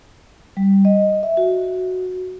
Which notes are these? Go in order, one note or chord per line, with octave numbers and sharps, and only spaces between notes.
G3
D#5
E5
F#4